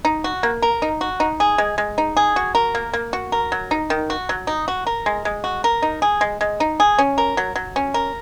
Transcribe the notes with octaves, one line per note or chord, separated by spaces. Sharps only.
D#4
F#4
A#3
A#4
D#4
F#4
D#4
G#4
G#3
G#3
D#4
G#4
F#4
A#4
A#3
A#3
F#4
A#4
F#3
D#4
D#3
F#4
F#3
D#4
F#4
A#4
G#3
G#3
F#4
A#4
D#4
G#4
G#3
G#3
D#4
G#4
C#4
A#4
F#3
F#3
C#4
A#4